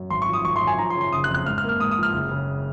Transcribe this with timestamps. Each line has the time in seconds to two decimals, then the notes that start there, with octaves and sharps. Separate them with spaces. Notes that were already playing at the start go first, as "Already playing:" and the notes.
Already playing: F#2
0.10 G#1 C6
0.22 C#6
0.28 F3
0.33 D#6
0.45 G#1 C#6
0.56 C6
0.62 F#2
0.67 G#5
0.78 F3 A#5
0.90 C6
0.95 C#3
1.01 C6
1.13 F#1 D#6
1.24 F#6
1.29 F2
1.34 F#6
1.46 G#2 F6
1.58 F6
1.64 A#3
1.69 F6
1.80 G#2 D#6
1.91 D#6
1.98 F3
2.03 F6
2.14 F#1
2.31 C#3